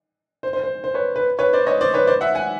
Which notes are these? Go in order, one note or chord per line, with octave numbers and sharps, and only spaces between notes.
C5
C5
C5
C5
B4 C#5
B4
B4 C#5
C5 D5
C#5 D#5
C5 D5
B4 C#5
C5 D5
E5 F#5
F#5 G#5